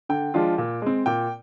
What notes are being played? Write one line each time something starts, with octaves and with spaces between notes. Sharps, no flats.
D3 G5
F3 G#3 D4 F4
A#2
G#3 C4
A#2 G5